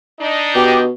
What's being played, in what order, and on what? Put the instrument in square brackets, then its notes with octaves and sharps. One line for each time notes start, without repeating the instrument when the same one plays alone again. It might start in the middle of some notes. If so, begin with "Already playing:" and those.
[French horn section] D4 D#4
[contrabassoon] B2 [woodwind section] G4